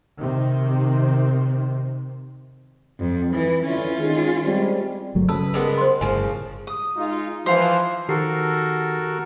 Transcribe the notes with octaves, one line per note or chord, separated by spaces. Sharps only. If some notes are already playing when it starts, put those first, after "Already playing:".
C3 D#3 C4
F2
E3
D3 E3 C#4 E4 F4
D#3 G#3
G3 G#3 C4
G1 F#3 A3
C#3 A4 B4 A5 E6
G3 G#3 B3 A4 A#4
C5 C6
G1 A2 C#3 F3 G#5
D#6
G#3 D#4 F4
E3 F3 C5 F5
D#3 F#4 G4 A4 A#4 C7